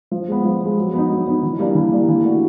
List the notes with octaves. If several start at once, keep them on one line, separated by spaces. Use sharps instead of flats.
F3
G#3 B3
F3
G#3 B3
F#3
B3 D#4
F#3
B3 D#4
E3
G3 A#3 D4
E3
G3 A#3 D4
E3
A3 D4 F#4